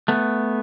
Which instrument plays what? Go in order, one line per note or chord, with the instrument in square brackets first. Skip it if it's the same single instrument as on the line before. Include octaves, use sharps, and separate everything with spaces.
[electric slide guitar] A3 B3